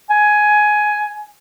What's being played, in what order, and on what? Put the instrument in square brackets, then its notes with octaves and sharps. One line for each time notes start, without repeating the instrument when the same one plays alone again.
[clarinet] G#5